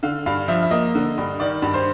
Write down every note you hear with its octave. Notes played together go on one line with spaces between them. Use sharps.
D3 F5
G2 F5
F3 E5
E5
A#3 D#5
D3
G2
D#3 D5
G2
C5